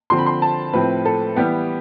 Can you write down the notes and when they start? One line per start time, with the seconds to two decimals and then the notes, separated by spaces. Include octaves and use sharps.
0.10 D3 F3 C4 C6
0.19 B5
0.26 C6
0.42 A5
0.73 A2 F3 C4 B4
1.05 A4
1.36 E3 G3 B3 G4